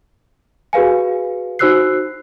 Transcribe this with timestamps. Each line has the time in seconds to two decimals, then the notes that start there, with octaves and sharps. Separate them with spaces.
0.73 F#4 G#4 B4 F5 G#5
1.59 D#4 F#4 C5 E6 F#6 C7